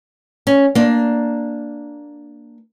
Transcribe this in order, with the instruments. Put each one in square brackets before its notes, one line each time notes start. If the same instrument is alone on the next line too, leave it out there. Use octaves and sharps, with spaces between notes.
[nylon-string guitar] C#4
A#3 D4